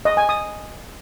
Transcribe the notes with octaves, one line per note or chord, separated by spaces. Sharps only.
D#5
G#5
D#6